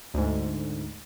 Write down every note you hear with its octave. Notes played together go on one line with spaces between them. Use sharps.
D2 G#2